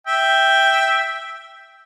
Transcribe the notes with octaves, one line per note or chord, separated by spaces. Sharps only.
E5 G5